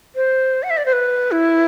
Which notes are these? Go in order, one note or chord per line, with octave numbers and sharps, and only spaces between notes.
C5
F#5
E5
D5
C5
B4
E4